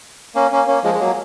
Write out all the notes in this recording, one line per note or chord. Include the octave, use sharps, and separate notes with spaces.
A#3 C#4
A#3 C#4
A#3 C#4
F3 G#3
G#3
F#3 A#3